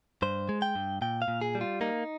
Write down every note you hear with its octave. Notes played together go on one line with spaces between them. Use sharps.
G2 C5
G#3
G5
G2
A#2 G5
F5
A#2
G#4
G3
F4
A#3 D#4